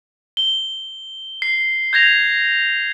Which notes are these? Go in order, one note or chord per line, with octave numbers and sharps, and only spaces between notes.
G7
C7
G6 G#6 A#6 F7